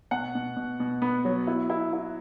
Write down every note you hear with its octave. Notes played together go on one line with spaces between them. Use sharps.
B2 F#5
B2
B2
B2
B3
F#3
E4
E4
E4